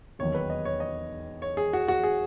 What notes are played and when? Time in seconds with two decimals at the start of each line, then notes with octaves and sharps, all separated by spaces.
0.19 E1 D#2 D#3 F#3 C#5
0.34 B4
0.50 D#5
0.65 C#5
0.80 D#5
1.42 C#5
1.57 G#4
1.73 F#4
1.88 F#4
2.03 G#4